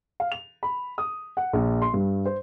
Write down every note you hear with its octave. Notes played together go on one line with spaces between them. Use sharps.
F5
F7
B5
D#6
F#5
A#1
C6
G2
C5